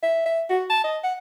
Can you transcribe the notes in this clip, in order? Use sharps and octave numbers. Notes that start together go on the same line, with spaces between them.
E5
E5
F#4
A5
D#5
F#5